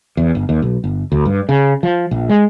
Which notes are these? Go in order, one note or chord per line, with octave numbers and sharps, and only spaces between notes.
E2
G1
D#2
B1
G1
D2
G2
C#3
F3
A#1
G#3